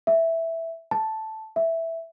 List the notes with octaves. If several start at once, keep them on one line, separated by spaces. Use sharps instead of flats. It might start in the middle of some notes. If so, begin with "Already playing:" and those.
E5
A5
E5